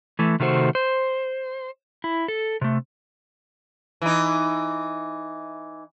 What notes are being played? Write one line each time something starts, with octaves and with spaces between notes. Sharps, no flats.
E3 A3
C3 D#3 A3 F#4 C5
C5
E4
A4
C3 A3
E3 D#4